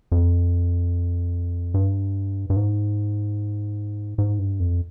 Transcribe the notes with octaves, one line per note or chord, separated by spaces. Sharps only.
F2
G2
G2
G#2
G#2
G2
F2